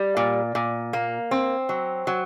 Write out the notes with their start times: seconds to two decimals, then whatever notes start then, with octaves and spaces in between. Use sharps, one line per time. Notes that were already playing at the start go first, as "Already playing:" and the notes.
Already playing: G3
0.17 A#2
0.55 A#2
0.93 A#3
1.31 C4
1.69 F#3
2.07 F#3